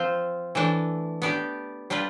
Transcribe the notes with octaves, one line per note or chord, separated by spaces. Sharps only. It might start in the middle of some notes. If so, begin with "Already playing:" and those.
Already playing: F3 C4 F4 C5
E3 A3 D4
B3 D4 G4 D5
G3 D4 F4 B4